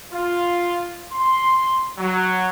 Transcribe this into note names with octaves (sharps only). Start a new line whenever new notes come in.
F4
C6
F#3